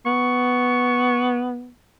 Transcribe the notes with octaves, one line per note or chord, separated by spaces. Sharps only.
B3 C#6